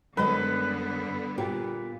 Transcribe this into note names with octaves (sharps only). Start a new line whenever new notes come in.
F#2 D3 G3 G#3 B3 B4 D#5
A#2 G4